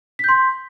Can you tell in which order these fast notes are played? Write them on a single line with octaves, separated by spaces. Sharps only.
B6 G6 C6